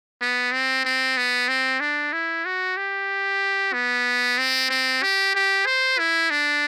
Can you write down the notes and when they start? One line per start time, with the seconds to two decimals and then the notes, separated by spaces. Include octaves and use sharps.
0.21 B3
0.52 C4
0.85 C4
1.17 B3
1.49 C4
1.80 D4
2.13 E4
2.45 F#4
2.77 G4
3.73 B3
4.38 C4
4.70 C4
5.02 G4
5.35 G4
5.66 C5
5.98 E4
6.30 D4